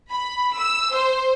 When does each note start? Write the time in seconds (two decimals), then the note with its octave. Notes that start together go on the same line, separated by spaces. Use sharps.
0.10 B5
0.57 E6
0.94 C5